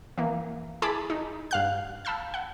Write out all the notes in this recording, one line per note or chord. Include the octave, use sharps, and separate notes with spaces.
E3 A#3
E4 G#4 A5 B5 D6
D#4
G2 F5 F#6
F5 A5 B5 E6 G6
F#5